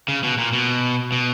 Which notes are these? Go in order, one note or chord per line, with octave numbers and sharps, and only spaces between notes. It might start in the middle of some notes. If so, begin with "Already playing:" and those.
C#3
B2
A#2
B2
B2